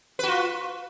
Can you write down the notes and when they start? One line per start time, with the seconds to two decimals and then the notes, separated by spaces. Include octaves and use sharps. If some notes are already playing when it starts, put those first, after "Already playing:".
0.19 B4
0.23 F#4
0.28 F4